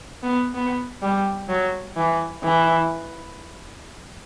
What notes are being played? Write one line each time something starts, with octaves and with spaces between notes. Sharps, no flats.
B3
B3
G3
F#3
E3
E3